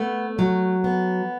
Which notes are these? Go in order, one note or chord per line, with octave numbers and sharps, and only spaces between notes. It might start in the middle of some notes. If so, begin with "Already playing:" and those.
Already playing: A3 B3
F#3
B3